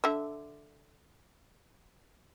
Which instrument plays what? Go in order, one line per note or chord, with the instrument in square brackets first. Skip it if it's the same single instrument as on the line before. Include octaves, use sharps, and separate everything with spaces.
[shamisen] D3 E5